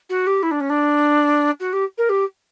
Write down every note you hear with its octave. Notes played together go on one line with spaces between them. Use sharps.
F#4
G4
E4
D4
C#4
D4
F#4
G4
A#4
G4